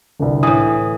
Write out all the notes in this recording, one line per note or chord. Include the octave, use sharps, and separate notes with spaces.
G1 C2
A2 E3 D#6